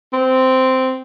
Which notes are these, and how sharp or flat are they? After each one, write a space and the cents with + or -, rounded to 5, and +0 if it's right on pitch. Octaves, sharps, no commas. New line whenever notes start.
C4 -10